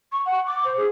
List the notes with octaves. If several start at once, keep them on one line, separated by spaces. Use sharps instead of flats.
C#6
F#5
D6
C5
G#4